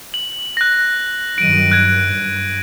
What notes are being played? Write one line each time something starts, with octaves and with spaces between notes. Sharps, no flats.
F#7
F#6 A#6
G2 D#3 F#3 D7 D#7
F#6 G#6
G2